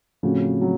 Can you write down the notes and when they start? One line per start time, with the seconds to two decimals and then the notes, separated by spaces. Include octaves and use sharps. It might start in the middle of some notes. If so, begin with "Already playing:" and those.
0.23 A2 C#3 F3 C4 F#4
0.62 F#3